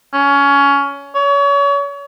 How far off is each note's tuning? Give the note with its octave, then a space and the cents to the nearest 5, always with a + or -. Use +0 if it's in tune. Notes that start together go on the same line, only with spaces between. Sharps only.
C#4 +20
C#5 +35